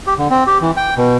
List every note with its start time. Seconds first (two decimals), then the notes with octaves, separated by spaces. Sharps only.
0.07 G4
0.18 D3
0.30 C4
0.47 G4
0.62 E3
0.77 G5
0.97 B2